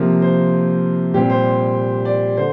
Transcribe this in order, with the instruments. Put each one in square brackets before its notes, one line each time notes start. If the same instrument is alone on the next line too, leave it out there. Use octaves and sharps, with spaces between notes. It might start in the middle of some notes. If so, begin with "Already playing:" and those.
Already playing: [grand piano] C3 F3 A#3 A#4
C5
A#2 G3 C4 G4
C5
D5
D3 C5